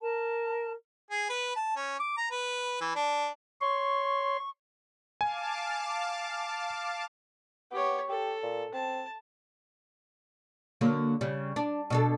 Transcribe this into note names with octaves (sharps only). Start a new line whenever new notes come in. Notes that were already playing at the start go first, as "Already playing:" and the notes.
A#4 A5
G#4
B4
A5
C#4
D6
A#5
B4
E3
D4
C#5 C6 C#6
F5 G#5 A5 D6
B3 G4 C#5
G4 A4
A#2
C4 A5
D3 F#3 A#3
C#3 G3
D4
B2 D4 A4